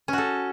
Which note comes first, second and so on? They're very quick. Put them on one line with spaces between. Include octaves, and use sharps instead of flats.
C#4 F#4 A4